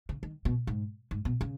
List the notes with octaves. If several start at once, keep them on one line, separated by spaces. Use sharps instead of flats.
C#3
D#3
B2
G#2
G#2
B2
C#3